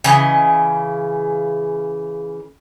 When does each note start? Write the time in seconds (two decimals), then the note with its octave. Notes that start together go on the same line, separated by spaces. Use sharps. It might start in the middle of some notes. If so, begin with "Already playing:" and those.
0.04 C#3 E3 D#5